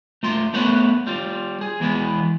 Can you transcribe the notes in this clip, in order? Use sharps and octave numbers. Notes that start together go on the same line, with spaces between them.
A3 F4 C6
A3 B3 B4 C#5 F#5
G3 F4
G#4
E2 E3 G#3 B3